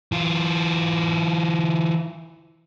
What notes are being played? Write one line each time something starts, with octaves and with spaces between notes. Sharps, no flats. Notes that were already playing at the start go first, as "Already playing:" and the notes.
E3 F4